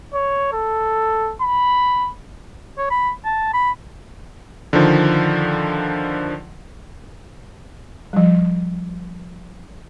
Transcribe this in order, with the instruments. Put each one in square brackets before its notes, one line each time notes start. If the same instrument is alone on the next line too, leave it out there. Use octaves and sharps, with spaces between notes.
[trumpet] C#5
A4
B5
[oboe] C#5
B5
A5
B5
[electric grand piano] D3 D#3 F3
[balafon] F3 G3